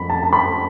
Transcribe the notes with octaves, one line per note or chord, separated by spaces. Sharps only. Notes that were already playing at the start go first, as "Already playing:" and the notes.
Already playing: F2 B5
A5
A5
B5